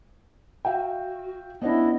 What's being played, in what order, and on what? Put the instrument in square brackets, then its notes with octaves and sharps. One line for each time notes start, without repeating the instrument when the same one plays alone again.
[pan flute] F#4 [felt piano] E5 F5 G5
[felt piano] B3 C#4 D4 [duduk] E4 [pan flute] D#5